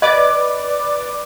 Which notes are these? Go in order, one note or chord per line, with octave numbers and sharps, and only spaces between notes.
B4 D5 D#5 D6